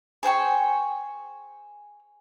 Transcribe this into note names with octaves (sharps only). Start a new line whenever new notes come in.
G#4 C5 G5 C#6